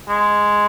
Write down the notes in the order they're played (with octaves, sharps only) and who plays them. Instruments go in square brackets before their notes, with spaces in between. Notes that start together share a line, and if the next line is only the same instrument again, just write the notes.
[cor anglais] G#3